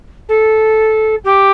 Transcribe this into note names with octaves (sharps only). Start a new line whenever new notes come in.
A4
G4